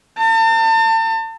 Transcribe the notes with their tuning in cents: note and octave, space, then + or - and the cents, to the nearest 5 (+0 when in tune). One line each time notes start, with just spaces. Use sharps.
A5 +35